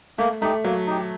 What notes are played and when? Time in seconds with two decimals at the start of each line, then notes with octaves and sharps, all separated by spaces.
0.18 A3 A#3
0.42 A3 D#4 G4
0.65 F#3 A#3
0.87 D#4 G4